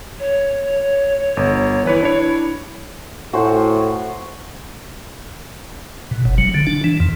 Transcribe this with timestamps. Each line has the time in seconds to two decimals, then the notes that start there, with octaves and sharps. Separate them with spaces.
0.19 C#5
1.37 G1
1.85 E3 E4 B4 C#5
2.03 D4 C#5
3.33 A2 F#4 C5 G#5
6.11 B2
6.25 F#1
6.38 F#3
6.54 D3
6.67 D4
6.84 E3
7.00 F2